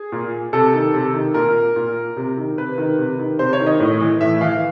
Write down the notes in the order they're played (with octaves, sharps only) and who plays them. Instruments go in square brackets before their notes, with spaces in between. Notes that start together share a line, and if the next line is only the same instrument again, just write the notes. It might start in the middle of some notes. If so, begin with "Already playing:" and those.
Already playing: [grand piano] G#4
A#2
C3 A4
D#3
C3
D#3
A#2 A#4
A#2
C3
D#3
C3 B4
D#3
C3
D#3
C3 C5
C#5
D#3
D#5
A2
E3
A2 E5
E3 F5